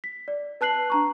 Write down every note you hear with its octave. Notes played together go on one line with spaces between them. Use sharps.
B6
D5
B4 A5 F#6 C7 F#7
D4 A#5 C#6